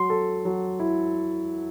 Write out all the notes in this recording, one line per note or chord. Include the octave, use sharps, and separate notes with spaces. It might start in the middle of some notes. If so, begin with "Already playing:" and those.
Already playing: F#3 C6
A4
F#3
E4